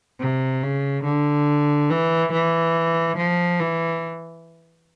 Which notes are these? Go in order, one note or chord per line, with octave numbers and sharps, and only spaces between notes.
C3
C#3
D3
E3
E3
F3
E3